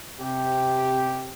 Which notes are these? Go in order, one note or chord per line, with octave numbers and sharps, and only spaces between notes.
C3 G4